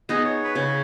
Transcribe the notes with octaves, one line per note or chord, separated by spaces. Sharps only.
B3 D#4 G#4 D#5
C#5
B4
C#3 C#5